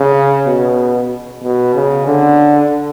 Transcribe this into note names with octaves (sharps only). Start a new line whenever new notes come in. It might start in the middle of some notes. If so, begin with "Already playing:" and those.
Already playing: C#3
B2
B2
C#3
D3